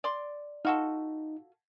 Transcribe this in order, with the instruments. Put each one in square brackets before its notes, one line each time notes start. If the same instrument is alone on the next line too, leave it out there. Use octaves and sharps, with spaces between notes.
[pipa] D5 C6
[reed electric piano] D#4 [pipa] F4 F#4 A4